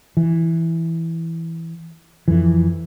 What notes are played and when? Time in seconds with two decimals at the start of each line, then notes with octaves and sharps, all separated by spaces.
0.17 E3
2.28 F2 E3